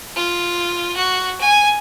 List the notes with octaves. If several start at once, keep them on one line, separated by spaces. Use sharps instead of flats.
F4
F#4
G#5